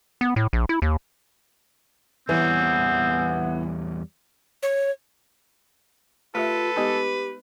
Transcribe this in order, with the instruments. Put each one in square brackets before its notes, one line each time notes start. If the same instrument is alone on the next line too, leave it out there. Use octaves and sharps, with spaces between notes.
[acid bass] B3
A2
A#1
E4
D#2
[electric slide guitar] E2 G3 C#5 [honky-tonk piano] E3 [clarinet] B3 [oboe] C4
[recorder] C#5
[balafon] A3 G4 E5 [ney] F4 [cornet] A4 [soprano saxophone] B4
[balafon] G#3 B3 D#4 [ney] G4